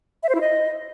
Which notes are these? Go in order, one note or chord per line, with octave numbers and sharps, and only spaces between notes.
E5
C5
E4
D#5